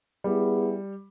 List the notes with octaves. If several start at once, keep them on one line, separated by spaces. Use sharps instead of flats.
G3 B3 E4 G#4